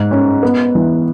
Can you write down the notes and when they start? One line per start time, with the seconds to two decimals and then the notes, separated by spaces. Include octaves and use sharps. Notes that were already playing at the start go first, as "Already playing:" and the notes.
Already playing: G#2
0.11 C#4
0.43 B3
0.75 E3